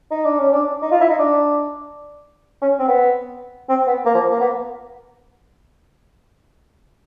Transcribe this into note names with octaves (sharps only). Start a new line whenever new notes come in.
D#4
D4
C#4
D4
D#4
F4
E4
D#4
D4
C#4
C4
B3
C4
B3
A#3
F3
A#3
B3